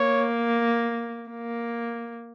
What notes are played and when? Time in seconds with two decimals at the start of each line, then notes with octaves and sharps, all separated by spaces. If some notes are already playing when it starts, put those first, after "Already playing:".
Already playing: A#3 C#5
1.29 A#3